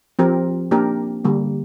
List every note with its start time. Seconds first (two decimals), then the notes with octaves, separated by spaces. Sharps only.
0.19 F3 C4 G4 A#4
0.71 A#3 D4 G4 A#4
1.24 D3 G3 A#3